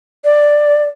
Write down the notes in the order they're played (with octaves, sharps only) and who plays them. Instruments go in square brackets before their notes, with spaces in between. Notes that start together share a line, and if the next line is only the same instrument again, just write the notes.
[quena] D5